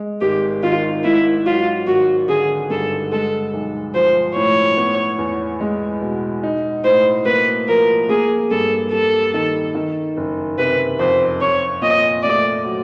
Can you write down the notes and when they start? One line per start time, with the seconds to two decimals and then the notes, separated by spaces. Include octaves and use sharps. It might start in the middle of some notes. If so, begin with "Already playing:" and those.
Already playing: G#3
0.21 G#1 G4
0.63 D#3 F4
1.04 G#2 E4
1.46 F#3 F4
1.87 G#1 F#4
2.28 D3 G#4
2.70 G2 A4
3.12 G#3 A4
3.53 B1
3.95 F3 C5
4.36 A2 C#5
4.77 B3
5.19 E2
5.61 G#3
6.01 B2
6.43 D#4
6.84 A2 C5
7.26 A#3 B4
7.68 F3 A#4
8.09 A#3 G#4
8.51 G2 A4
8.91 G3 A4
9.34 D#3
9.75 D#3
10.17 F#1
10.58 C3 B4
10.99 F2 C5
11.41 C4 C#5
11.82 A#2 D#5
12.23 A3 D5
12.65 F#3